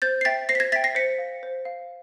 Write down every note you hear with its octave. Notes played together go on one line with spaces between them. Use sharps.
C5 G6 A6
C7
E5 G5 A6 B6
C5 A#6 C7
B6
G#6 A#6
E5 G5 A6 B6
A#6 C7
C5 B6 C#7
F5
C5
F5